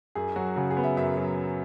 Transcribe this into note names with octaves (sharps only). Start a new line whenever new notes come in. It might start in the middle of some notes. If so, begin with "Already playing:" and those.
F#2 G#4
F#3 F#4
C#3 F#4
G#4
B3
E5
F#2 E5
F#3